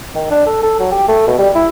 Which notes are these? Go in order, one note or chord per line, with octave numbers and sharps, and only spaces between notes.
D#3
D4
A4
A4
F#3
G4
A3
B2
G3
E4